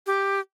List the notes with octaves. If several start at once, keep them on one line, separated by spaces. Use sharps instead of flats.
G4